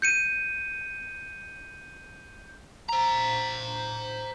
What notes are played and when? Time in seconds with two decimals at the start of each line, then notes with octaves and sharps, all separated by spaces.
0.02 G6 C#7 D#7
2.89 C5 A#5